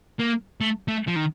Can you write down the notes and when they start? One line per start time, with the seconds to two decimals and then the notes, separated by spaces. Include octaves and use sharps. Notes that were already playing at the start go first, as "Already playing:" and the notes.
0.20 A#3
0.61 A3
0.88 A3
1.08 F3
1.16 D#3